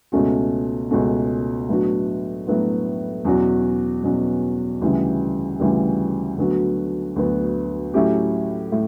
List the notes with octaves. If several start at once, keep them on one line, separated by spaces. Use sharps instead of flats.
C#2 B2 A3 C#4 F#4
C#2 B2 A3 C#4 F#4
A2 F#3 B3 D4 F#4
A2 F#3 B3 D4 F#4
E2 B2 F#3 C#4 F#4
E2 B2 F#3 C#4 F#4
D2 C#3 E3 G3
D2 C#3 E3 G3
D2 D3 F#3 B3 F#4
D2 D3 F#3 B3 F#4
A2 F#3 C#4 E4 G4
A2